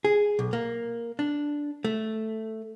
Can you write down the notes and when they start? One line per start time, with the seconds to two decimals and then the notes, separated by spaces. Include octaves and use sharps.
0.05 G#4
0.39 B1
0.53 A#3
1.19 D4
1.85 A3